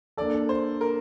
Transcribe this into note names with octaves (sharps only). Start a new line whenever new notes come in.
A#3 D4 A4 D5
C5
A#4